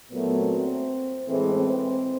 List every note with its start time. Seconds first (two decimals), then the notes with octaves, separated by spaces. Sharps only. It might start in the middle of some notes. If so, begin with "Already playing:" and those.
0.11 A#2 F#3 A3 B3
0.39 C4
1.26 A2 E3 G#3 C4
1.54 C4